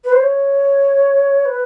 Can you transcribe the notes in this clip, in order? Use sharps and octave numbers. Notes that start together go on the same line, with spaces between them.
B4
C5
C#5
B4